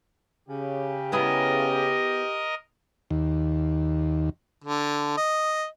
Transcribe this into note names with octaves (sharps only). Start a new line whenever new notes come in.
C#3 G4
B3 E4 G#4 A#4 D#5
D#2
D3
D#5